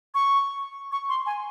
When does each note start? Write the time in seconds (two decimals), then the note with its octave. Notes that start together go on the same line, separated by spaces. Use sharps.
0.15 C#6
0.92 C#6
1.09 C6
1.26 G#5